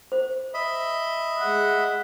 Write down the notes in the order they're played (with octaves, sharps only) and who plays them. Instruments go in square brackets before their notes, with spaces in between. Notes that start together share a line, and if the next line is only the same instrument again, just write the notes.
[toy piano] C5
[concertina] D#5 E5 B5
[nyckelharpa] G#3 F#5